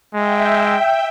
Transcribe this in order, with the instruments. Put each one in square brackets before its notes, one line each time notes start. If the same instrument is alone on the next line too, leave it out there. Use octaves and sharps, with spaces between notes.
[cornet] G#3 [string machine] E5 G5